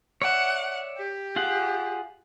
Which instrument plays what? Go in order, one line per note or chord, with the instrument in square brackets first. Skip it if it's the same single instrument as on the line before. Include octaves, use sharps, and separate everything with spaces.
[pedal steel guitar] C#5 D5 E5 [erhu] F#5
[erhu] G4
[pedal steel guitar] F4 G#4 F#5